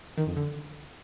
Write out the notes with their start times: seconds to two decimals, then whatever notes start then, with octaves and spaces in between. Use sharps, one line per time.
0.18 D#3
0.27 F2
0.37 D3